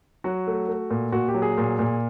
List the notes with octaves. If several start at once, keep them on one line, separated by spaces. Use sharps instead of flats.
F#3 F#4
A3
A3
A#2
A#2 F#4
G4
F#3
G#4
A#2
A#2